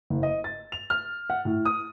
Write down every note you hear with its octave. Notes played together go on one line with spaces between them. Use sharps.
F#1
D#5
A6
F7
F6
F#5
A2
D#6